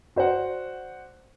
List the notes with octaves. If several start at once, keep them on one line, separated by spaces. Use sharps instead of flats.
F#4 C5 D5 F#5